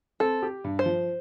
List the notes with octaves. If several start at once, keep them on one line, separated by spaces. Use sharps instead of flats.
C4 A4
G4
G2
C5
F3